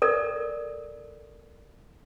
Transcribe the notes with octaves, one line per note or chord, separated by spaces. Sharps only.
A4 A#4 D5